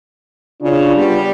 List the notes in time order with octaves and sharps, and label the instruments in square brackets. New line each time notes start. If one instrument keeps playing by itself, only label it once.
[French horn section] C#3 F4 [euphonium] D4
[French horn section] G3 B3